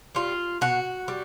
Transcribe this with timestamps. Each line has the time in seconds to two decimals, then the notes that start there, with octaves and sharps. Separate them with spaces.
0.15 G3 F4
0.61 B2 F#4
1.08 G3